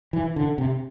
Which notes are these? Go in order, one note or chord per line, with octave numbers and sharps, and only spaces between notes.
E3
D3
C3